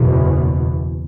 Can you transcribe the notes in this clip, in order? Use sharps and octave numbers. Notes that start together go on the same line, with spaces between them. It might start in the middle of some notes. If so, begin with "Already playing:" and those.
Already playing: F#1 E2 B2